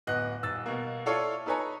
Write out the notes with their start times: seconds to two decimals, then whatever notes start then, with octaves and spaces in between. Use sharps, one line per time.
0.07 D1 B3 D#5 F#6
0.43 D#1 E6 A6
0.66 B2 A#3
1.06 E4 F4 A4 C#5 D5 F5
1.46 D#4 A4 B4 C#5 G#5 A#5